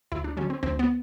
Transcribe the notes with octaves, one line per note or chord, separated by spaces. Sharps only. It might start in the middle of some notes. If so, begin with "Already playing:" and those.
D2 E4
D4
D3 F#3 C#4
C4
D2 C4
B3